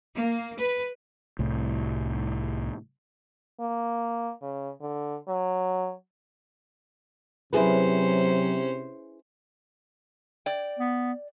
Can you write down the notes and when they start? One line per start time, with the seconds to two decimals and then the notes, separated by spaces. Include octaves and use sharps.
0.17 A#3
0.60 B4
1.39 C2 A2
3.60 A#3
4.42 C#3
4.81 D3
5.28 F#3
7.53 C3 F#3 C#4 E4 G#4 B4 C5
10.46 D5 G5
10.79 B3